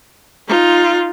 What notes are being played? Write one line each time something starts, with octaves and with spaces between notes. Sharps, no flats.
D#4 F4